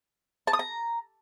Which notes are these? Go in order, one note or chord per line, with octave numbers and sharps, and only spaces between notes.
A5
D#6
A#5